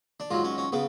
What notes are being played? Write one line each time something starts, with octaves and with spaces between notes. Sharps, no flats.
D4
G#2 F#3 F4
C#4
C#4
C#3 B3